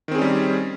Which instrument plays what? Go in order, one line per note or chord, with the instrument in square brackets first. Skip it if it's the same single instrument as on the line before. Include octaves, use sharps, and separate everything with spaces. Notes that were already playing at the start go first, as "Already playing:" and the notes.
[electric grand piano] D#3
C4
G#4
C#4
G3